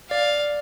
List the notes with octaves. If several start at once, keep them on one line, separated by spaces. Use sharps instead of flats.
D5 F5